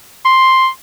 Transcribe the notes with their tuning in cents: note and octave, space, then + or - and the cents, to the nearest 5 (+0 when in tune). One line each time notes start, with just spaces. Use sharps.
C6 +5